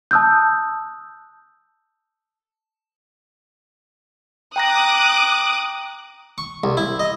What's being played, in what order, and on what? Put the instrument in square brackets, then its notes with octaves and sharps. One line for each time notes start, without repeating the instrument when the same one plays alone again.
[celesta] A5 D#6 E6 F#6 G6
[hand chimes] G5 A#5 A#6 [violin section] D6 D#6 F#6
[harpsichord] C#6
C2
E4
D#5